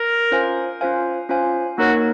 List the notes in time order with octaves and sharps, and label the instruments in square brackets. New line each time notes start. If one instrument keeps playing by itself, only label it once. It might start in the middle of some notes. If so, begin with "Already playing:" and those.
Already playing: [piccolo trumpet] A#4
[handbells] C#4 F4 C5 F5 G#5
C#4 F4 C5 F5 G#5
C#4 F4 C5 F5 G#5
[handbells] A#3 D#4 A#4 C#5 [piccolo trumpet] F#4